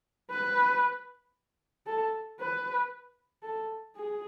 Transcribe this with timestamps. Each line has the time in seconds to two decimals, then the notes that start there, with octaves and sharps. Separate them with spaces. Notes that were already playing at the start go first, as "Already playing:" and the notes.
0.31 B4
1.86 A4
2.40 B4
3.43 A4
3.96 G#4